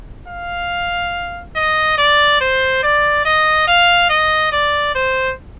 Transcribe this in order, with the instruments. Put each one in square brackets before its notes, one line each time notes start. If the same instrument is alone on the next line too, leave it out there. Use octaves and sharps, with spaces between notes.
[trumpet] F5
D#5
D5
C5
D5
D#5
F5
D#5
D5
C5